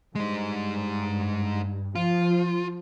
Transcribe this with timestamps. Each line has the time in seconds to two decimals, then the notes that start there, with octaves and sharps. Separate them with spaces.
0.15 G2 G#3 D#4
1.95 F3 F4